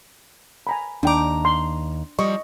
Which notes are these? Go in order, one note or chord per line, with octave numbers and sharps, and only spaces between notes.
G#5 A#5 B5
D#2 D4 G5 A#5 D6
C6
F3 G3 D#5 C#6